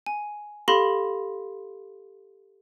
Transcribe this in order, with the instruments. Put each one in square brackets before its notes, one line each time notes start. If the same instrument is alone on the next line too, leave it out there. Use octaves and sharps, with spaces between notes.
[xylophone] G#5
G4 A4 F5 B5 C6 A#6